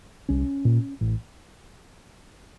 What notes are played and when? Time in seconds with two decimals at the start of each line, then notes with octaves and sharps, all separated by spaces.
0.29 C2 C#4
0.65 A#2
1.01 A1